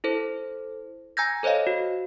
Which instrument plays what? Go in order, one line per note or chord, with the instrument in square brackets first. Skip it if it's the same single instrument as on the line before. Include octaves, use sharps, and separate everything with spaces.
[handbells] E4 A4 C5
G#5 A#5 E6 G6 G#6 A#6
A4 C5 C#5 D#5 F5
F#4